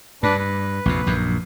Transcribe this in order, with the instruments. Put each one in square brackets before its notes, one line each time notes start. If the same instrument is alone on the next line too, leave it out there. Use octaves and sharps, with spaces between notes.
[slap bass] G2 [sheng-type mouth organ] D4 B4
[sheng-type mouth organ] B4
[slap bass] A#1 F2 C3
A#1 F#2 A#2